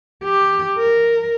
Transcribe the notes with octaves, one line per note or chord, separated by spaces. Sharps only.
G4
A#4